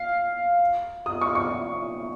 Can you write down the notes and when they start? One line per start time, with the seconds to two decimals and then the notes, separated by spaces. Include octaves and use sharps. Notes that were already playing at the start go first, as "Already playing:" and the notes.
Already playing: F5
1.06 D#6
1.21 C#6
1.35 C#6